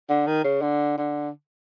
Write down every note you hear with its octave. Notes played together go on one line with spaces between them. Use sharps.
D3
D#3
C#3
D3
D3